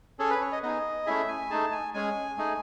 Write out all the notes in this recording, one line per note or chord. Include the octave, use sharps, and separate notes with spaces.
C#4 G#4 A4
B4
C#5
D#5
B3 D#4 G#4 D#5
A3 C#4 E4 G#4 E5
G#5
A3 D#4 G#4 A5
G#5
G#3 C#4 G#4 G#5
A3 D#4 G#4